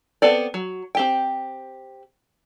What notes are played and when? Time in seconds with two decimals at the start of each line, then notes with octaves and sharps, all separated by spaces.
0.22 B3 C4 A4 D5
0.54 F#3
0.95 C4 G4 G5